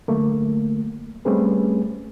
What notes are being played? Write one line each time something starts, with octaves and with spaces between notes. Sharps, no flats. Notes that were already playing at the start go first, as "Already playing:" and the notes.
D3 F#3 A3 A#3
G3 A3 C4 C#4 G#4 B4